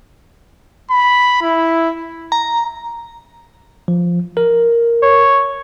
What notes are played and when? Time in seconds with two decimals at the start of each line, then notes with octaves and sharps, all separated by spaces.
0.91 B5
1.43 E4
2.32 A#5
3.88 F3
4.37 A#4
5.02 C#5